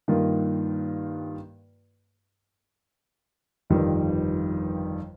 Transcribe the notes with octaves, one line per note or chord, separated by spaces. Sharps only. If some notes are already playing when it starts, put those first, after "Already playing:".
G2 D#3 A#3 F4
G1 F2 D#3 G3